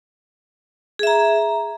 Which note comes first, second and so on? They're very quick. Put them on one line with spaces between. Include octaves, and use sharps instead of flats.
G#4 E5 A#5